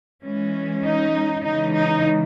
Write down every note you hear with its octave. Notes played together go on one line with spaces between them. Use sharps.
E3 G#3 C#4
D#4
C#3 E3 G#3 D#4
D#4